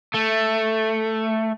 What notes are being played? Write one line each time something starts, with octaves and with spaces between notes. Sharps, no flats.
A3